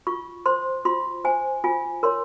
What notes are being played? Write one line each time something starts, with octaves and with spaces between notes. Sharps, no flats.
F4 C#6
C5 C6
F4 C6
C5 G#5
F4 G#5
A#4 C#5 C6